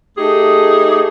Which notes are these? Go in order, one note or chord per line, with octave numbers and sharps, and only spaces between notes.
A3 D#4 G4 G#4